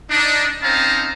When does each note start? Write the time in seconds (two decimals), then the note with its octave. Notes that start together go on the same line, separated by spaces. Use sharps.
0.10 D4 D#4
0.62 C4 C#4 D#4 F5 A5 A#5